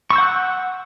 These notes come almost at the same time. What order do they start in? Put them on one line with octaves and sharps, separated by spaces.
C#6 E6 G6 F#5 F#6